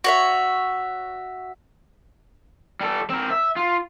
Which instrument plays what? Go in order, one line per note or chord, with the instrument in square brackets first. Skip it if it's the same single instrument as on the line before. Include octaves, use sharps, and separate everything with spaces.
[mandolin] F#4 C#5 E5
[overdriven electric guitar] G3 A4
C4 A#4
E5
F4